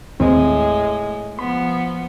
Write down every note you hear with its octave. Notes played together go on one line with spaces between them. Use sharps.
D#2 A2 D#3 G#3 C4
F3 B3 B5